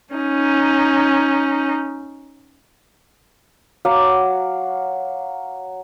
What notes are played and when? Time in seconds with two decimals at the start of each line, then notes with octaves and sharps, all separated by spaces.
0.14 C#4 D#4
3.85 F#3 F5 F#5 D6